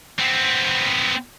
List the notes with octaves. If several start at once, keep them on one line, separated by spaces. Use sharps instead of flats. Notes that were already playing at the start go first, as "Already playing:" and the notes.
B3 C4